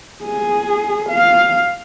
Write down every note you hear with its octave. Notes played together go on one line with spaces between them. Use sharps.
G#4
F5